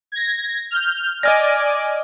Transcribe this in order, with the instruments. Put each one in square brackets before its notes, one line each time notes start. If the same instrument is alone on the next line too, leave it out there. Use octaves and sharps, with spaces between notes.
[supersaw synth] G#6 A#6
F6 G6
[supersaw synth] D5 G#5 D6 [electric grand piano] D#5 F6 A#6